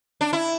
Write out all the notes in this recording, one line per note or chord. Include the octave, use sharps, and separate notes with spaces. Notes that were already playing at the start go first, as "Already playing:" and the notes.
D4
E4